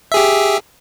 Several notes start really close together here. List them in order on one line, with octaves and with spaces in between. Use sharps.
E5 G#4 G4